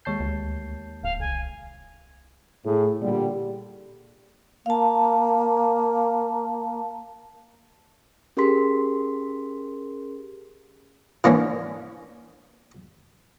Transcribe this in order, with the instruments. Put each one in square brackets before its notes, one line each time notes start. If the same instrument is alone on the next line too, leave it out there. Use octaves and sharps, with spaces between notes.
[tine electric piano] D#2 A5 G6 [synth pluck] G#3 C#5 C7
[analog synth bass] D2
[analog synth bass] D1 [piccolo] F5
[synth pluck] C2 [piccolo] G#5
[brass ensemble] A2 G#4
A#2 D3 G3
[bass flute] A#3 [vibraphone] F5 A5
[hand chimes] C#4 G4 G#4 A#4 C6 B6
[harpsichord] E3 A#3 C#4 D4